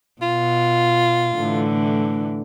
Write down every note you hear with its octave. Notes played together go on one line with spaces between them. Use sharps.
B2 F4
A2 D3 E3